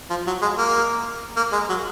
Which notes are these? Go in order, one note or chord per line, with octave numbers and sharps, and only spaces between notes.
F3
F#3
G#3
A#3
A#3
G#3
F#3